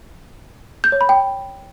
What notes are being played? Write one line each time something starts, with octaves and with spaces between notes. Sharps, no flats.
G6
C#5
B5
G5